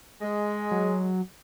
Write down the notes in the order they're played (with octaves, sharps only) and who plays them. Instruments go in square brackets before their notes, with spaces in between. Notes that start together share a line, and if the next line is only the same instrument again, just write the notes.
[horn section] G#3
[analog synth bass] F#3